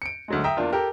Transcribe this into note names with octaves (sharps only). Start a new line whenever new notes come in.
C#7 D7
D2 F#3 G#3
E5 G5 A#5 D#6
E2 A#3 D4 F4
G4 A4 A#4